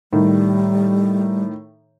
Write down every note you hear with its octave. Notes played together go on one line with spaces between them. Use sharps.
A2 D#3 G3